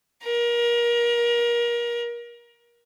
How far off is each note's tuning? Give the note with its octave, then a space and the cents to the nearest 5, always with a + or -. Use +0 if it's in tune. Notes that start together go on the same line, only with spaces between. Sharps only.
A#4 +30